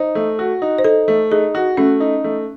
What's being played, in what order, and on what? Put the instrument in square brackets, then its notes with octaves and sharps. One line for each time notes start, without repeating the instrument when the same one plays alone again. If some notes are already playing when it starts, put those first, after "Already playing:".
Already playing: [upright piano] D#4 [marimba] C5
[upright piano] A3
F#4
D#4
[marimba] C5
[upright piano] D#4 [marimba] A4
[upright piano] A3
[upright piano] D#4 [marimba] G#4
[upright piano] F#4
[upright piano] A3 [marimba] C#4
[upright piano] D#4
A3